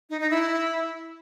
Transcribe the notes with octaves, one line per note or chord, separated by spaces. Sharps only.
D#4
D#4
E4